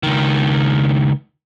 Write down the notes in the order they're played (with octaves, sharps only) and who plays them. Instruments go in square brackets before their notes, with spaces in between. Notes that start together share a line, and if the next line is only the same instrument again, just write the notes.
[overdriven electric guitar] C#2 D#3